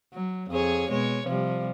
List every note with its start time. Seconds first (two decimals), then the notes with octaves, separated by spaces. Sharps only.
0.13 F#3
0.50 F2 G#4 C#5
0.91 B2 G#3 C#5
1.26 C3 F3 G3